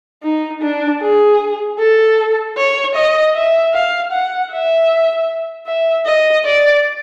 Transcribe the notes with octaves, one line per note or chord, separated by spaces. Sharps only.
D#4
D4
G#4
A4
C#5
D#5
E5
F5
F#5
E5
E5
D#5
D5